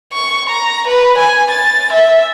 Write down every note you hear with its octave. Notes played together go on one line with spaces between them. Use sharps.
C#6
A#5
B4
G#5
A6
E5